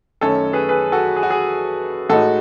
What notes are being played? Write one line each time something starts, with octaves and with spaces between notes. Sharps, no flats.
F#2 D#3 A3 C#4 A4 C#5
G#4 B4
G#4 B4
F#4 A4
G#4
F#4
G#4
A2 G#3 D#4 F#4 A4